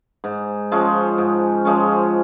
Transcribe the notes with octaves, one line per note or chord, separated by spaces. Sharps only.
G#2
F3 G#3 C#4
G#2
F3 G#3 C#4